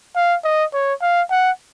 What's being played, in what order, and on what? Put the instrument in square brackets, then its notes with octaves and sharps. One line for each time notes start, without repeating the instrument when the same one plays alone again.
[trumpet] F5
D#5
C#5
F5
F#5